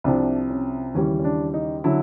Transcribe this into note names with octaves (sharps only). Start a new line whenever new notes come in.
C2 C3 F3 D4
C#4
D#2 C#3 E3 G3 C#4
C#4
D4
D#4
D3 F#3 E4